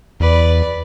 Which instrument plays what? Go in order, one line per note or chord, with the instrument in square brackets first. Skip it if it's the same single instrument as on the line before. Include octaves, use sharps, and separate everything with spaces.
[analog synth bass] E2 [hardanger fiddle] B4 D5